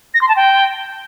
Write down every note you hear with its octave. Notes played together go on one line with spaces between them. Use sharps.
A#6
C6
A5
G5